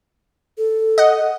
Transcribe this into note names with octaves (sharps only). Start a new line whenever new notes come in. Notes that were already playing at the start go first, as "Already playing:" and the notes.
A4
D#5 F#5